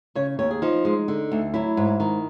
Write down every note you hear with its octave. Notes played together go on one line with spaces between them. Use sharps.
C#3 C#5
D#2 C#5
G#4
F3 D#4
G#3
D3
D2
F#3 E4
G#2
D#3